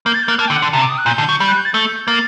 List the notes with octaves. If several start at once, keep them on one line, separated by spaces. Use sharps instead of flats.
A#3 G6
A6
G6
A#3
F#6
A#3 A5
G5
D3
F#5
D3 A5
C3 A5
D6
D#6
F#6
A#2 G6
D3
F#3
G3 G6
F#6
G6
A6
A3 G6
A#3 A6